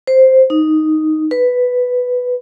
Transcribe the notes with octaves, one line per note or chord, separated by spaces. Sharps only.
C5
D#4
B4